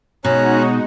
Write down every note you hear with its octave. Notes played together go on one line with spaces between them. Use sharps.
B2 G#3 C#4 D#4 F#4 C#5 A#5 F#6